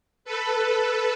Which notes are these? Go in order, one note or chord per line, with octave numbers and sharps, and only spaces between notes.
A4 B4